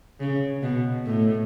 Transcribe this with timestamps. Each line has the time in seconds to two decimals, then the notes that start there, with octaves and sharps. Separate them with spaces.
0.20 C#3
0.62 B2
1.06 A2